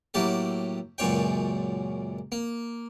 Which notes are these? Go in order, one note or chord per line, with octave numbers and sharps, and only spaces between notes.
A2 F#3 A#3 G4 A4
C#2 F#2 A#2 C#5 G5
A#3